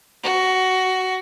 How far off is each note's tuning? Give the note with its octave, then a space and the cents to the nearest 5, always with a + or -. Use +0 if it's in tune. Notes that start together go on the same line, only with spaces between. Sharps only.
F#4 +15